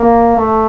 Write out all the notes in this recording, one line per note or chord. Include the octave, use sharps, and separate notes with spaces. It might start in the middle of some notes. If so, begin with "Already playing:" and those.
Already playing: A#3
A3